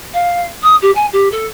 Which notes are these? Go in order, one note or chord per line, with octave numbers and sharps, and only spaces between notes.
F5
D#6
G4
G#5
G4
A4